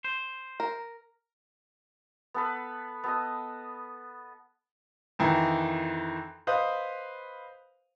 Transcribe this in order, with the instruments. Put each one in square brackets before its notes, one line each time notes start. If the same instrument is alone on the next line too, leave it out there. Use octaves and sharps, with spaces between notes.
[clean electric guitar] C5
[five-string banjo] A#4
[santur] B3 A4 B4
B3 A4 D#5
[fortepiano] F2 D#3 E3
B4 C5 D#5 F5 D#6